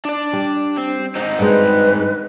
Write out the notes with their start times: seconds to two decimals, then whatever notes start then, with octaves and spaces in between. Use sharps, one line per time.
0.05 D4 D5
0.33 G3
0.77 C4
1.15 G#2 C4 D#4
1.39 G2 G#3 B4